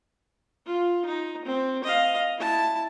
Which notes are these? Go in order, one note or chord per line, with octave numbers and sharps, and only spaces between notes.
F4
D#4
C4
D#5 F5
E4 A5